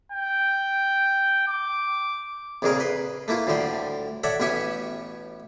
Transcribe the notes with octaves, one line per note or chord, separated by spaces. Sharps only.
G5
D6
A#1 F2 A#2 C#3 G#4 A#4
B4 C6
A3 A#3 E4 F4
D2 A2 D3 G3 G4 C6
A4 C#5 D5 E5 F#5
A1 B2 C#4 G4 E5 C#6